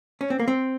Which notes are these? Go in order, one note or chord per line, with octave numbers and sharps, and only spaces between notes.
C#4
C4
A#3
C4